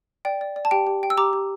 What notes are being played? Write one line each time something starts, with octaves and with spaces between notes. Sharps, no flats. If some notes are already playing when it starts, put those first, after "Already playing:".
D5 G5
D5
D5
A5
G4 G5
G4
G5
E6
G4 A#5 D6
G4